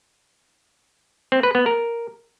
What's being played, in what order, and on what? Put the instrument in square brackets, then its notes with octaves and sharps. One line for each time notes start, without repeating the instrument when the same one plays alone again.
[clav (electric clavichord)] C4
B4
B3
A#4